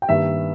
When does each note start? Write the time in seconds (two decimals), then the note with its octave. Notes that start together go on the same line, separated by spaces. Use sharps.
0.02 G5
0.09 G2 D#3 A#3 E5